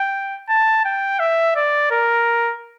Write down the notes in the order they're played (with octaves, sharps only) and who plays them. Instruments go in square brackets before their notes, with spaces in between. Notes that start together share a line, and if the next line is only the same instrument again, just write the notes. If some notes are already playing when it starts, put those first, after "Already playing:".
Already playing: [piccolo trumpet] G5
A5
G5
E5
D5
A#4